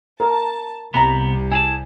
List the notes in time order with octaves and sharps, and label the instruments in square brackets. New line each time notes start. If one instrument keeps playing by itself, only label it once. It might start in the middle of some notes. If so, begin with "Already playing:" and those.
[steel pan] A#4 [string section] A5
[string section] C2 G3 [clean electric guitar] C3 B3 [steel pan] A#5 B5
[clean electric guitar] E4 G#4 A5 [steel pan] G#5